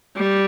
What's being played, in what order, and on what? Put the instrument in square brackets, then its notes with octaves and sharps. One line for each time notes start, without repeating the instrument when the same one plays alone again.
[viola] G3